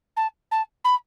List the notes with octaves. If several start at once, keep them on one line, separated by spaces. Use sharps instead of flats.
A5
A5
B5